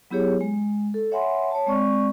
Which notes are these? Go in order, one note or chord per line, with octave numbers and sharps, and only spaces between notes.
F#3 B3 E4 G4 G#4 C#5
G#3
A4
C#5 E5 F#5 G#5 B5 C6
C#5 A5
G#3 C4 D5 C#6